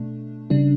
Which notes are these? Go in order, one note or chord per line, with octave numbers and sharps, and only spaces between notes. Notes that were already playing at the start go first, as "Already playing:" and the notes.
Already playing: B2 A3 D4
C#3 G3 D4